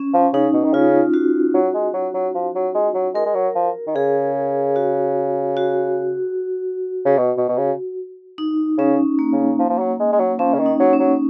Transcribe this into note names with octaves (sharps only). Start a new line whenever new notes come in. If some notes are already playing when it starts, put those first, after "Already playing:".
Already playing: C#4
F3
C#3 D#4
B2
D#3
C#3 F4
F#4
F#3
G#3
F#3
F#3
F3
F#3
G#3
F#3
G#3 A#4
G#3
F#3
F3
D#3
C#3 G#4
F#4
F#4
C#3
B2
B2
B2
C#3
D#4
C#3 C#4
A#3
C#3
F3
F3
F#3
G#3
G#3
F#3
F3 C#4
C#3
D#3
D#4
F#3
C#4
F#3